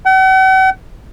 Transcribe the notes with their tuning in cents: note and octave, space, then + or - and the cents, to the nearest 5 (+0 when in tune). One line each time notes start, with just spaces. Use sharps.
F#5 +45